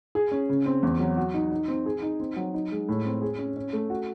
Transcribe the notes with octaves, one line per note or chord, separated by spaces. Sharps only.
G#4
C#4
C#3
C4
E2
F#3
F#4
D#4
D#4
C4
G#4
D#4
C4
F#3
D#4
G#3
A2
C4
G#4
C#4
C#4
A3
F#4